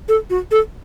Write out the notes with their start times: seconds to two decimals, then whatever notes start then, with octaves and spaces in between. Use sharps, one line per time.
0.08 A4
0.30 F#4
0.51 A4